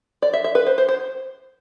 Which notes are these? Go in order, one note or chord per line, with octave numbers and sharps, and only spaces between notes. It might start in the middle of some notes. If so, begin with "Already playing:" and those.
D5
E5
E5
B4
C5
C5
C5